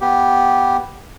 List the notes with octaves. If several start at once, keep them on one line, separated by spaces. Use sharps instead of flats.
B3 G4